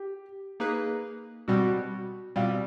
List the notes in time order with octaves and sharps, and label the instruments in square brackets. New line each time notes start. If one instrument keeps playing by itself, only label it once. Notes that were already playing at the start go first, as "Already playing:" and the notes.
Already playing: [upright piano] G4
[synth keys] A#3 D#4 G#4 B4
[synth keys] B2 G3 C4 [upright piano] F#4
[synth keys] B2 G3 C4 [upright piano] F4